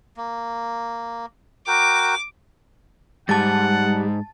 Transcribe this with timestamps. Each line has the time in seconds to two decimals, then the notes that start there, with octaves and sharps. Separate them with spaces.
0.17 A#3
1.68 F#4 A#4 G5 D6
3.29 G#2 G3 F#5 A5 A6